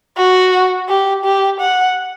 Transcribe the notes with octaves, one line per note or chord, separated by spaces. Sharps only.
F#4
G4
G4
F#5